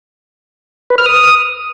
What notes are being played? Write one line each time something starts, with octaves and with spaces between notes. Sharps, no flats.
B4
F6
D#6